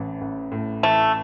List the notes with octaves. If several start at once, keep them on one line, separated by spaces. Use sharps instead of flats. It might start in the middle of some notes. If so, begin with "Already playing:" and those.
Already playing: A1 A2 E3
A1
A2
E3 A3